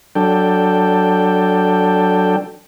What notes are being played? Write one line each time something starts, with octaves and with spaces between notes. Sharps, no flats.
F#3 D4 A4 G5